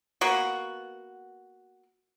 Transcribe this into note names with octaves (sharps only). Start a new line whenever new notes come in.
A#3 B3 F#4